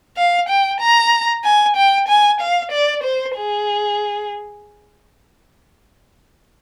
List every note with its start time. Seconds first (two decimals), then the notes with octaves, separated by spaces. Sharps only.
0.17 F5
0.49 G5
0.80 A#5
1.44 G#5
1.76 G5
2.08 G#5
2.41 F5
2.72 D5
3.04 C5
3.36 G#4